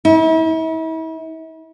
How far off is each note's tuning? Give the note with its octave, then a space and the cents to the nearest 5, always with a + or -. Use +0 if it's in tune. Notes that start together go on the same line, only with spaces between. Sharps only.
E4 -40